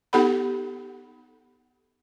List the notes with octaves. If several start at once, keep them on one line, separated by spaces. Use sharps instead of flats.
B3 D#4 G4 A4 F#5 B5